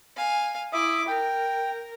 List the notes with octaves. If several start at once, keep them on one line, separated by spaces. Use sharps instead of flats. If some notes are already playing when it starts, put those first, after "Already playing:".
F5 G#5
E4 E5 D6 D#6
A#4 G5